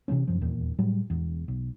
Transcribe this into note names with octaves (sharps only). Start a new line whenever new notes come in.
C3 E3 A3 C#4
F1 F#2 F3
D#1 E2 A#2
A2 F#3 G3
E1 E2
B1